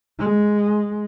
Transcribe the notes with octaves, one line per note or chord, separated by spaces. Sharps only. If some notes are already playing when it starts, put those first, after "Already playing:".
G#3